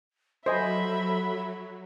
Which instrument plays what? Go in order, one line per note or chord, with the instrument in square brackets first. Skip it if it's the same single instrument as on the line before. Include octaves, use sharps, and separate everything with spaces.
[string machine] F#3 [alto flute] A4 [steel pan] C5 D#5 G#5 [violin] E5 B5